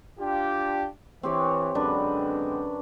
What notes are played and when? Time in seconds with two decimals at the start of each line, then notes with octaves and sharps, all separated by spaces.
0.19 D4 F4 G4
1.23 E3 C4 G4 C#5
1.75 F#2 D3 G#3 C4 D4 B4